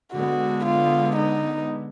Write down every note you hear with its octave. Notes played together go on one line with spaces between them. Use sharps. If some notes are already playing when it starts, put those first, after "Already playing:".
D3 G#3 B3 F#4
F4
D#4